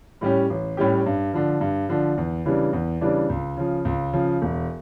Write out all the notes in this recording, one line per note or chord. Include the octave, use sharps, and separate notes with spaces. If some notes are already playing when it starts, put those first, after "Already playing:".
A2 G3 C#4 G4
A1
A2 G3 C#4 G4
G2
D3 F3
G2
D3 F3
E2
C#3 E3 G3 D4
E2
C#3 E3 G3 D4
C#2
C#3 F3
C#2
C#3 F3
E1